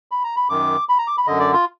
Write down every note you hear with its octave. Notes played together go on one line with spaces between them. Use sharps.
B5
A#5
B5
F#2 D#3 D6
B5
A#5
D6
B5
F#2 D3 D#5
D5
F4